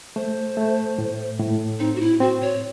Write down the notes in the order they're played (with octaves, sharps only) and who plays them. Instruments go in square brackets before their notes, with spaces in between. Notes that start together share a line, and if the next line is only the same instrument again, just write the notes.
[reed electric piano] A3 [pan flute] C5
[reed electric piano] A3
A2
A2
[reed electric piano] C4 [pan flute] D#4
[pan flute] F#4
E4
[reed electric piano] C4 [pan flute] F#4
[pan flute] C#5